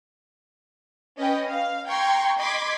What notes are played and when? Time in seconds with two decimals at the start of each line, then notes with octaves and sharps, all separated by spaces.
1.17 C#4 B4 D#5 G5
1.48 F5
1.86 G5 A#5 C6 C#6 G#6
2.37 D#5 B5 C6 D6 G#6 B6